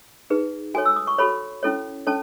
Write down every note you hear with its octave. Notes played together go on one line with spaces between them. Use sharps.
D#4 G#4 B4
F#4 A4 C#5 G#5
E6
D#6
C#6
F#4 A4 C#5 B5
C#4 E4 A4 C#5
C#4 A4 C#5 A5